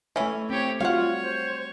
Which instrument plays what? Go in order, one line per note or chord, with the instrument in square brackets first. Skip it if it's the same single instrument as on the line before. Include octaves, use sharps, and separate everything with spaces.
[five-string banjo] E3 C#4 [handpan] A3 C#5 E5
[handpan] C4 [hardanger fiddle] G4 C#5
[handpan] G3 F#4 [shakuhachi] F4 [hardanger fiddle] C#5 [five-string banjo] F5 F#5
[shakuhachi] C5